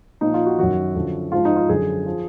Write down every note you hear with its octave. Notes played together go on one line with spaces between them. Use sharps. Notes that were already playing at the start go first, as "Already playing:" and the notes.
A#2 F3 D#4
F4
F#4
F#2 D#3 F#4
F#2 D3 F3
G#2 F3 F4
D#4
F4
F#2 D3 F3 G#4
F3